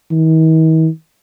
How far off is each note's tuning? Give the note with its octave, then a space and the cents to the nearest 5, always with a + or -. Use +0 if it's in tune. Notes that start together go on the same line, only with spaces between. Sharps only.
D#3 +45